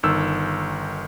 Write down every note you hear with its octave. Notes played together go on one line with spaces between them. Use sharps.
G1 D#3 E6